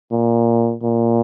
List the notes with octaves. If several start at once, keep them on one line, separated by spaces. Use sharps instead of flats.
A#2
A#2